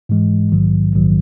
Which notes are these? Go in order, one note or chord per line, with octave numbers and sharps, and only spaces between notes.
G#2 E3 G#3
A#1 G#2 D#3 F#3
A#1 G#2 D#3 F#3